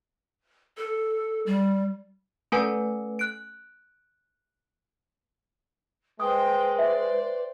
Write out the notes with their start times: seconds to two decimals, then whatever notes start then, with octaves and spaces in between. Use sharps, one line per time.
0.77 A4
1.46 G3
2.52 A3 C#4 A4 B4 G#5
3.19 F#6 D7
6.20 G#3 B4 C5 G5 D#6
6.79 C5 D5 E5